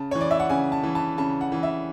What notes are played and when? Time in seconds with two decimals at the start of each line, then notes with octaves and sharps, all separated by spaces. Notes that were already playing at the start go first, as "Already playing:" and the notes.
Already playing: C#3 A5
0.11 E3 C#5
0.21 D5
0.31 E5
0.40 F#5
0.49 C#3 G#5
0.72 A5
0.83 E3
0.95 A5
1.17 C#3 A5
1.41 F#5
1.52 E3
1.63 E5